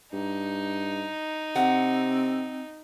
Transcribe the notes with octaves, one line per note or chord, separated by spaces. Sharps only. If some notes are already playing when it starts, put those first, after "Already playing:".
G2 D#4
C3 C4 F#5